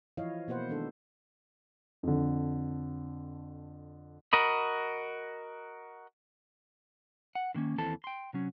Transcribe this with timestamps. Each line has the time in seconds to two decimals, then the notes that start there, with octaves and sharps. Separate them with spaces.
0.17 E3 F3 E4 C#5 D#5 F5
0.48 B2 A#3 B4 C5 F#5
0.69 D#3 G#3 D4 A4
2.03 F2 D3
4.33 F#4 A#4 D#5 B5
7.35 F#5
7.55 D3 D#3 A#3 C#4
7.78 D#2 E3 C4 A4 A5
8.04 G5 C6
8.33 C3 F#3 C#4